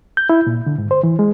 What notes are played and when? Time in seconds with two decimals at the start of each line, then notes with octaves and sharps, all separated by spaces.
0.17 G6
0.30 E4
0.47 A#2
0.66 D3
0.78 G#2
0.91 C5
1.03 E3
1.19 G#3